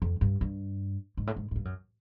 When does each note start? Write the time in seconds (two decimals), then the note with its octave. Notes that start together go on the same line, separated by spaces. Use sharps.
0.02 F2
0.21 G2
0.41 G2
1.17 G#2
1.27 A2
1.36 G#2
1.51 G#2
1.56 G2
1.65 F#2